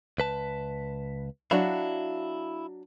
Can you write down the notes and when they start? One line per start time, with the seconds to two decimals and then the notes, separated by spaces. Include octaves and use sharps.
0.18 C#2 B4 A5
1.51 F#3 D4 E4 F#4 F5